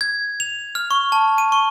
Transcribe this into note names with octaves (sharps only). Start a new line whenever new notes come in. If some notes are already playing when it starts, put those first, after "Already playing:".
G#6
F7
F6
C#6
A5
D#7
C#6